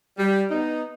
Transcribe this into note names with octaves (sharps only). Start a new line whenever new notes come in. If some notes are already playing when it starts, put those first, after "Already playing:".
G3
B3 D#4